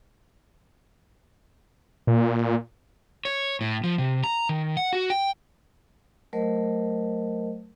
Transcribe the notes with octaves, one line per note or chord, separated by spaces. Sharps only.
A#2
C#5
A2
F3
C3
A#5
D#3
F#5
F#4
G5
F#3 A3 A#4 C5 D#5